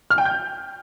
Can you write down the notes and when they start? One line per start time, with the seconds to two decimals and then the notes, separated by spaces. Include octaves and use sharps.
0.10 F6
0.18 G5
0.25 G6